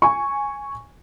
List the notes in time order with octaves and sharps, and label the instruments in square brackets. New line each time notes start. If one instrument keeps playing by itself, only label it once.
[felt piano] G#5 C#6